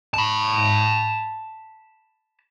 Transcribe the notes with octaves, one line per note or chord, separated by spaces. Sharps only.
A5 B5